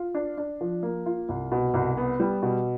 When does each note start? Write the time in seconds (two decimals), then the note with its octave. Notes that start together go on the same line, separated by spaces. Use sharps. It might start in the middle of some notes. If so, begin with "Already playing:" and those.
Already playing: F4
0.14 D4
0.38 D4
0.61 F3
0.83 A#3
1.06 F4
1.29 C2
1.52 B2
1.74 C2
1.97 B3
2.20 G3
2.42 B2